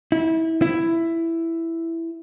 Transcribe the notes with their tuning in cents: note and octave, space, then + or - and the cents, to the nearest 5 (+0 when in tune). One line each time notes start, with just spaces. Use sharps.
E4 -25
E4 +5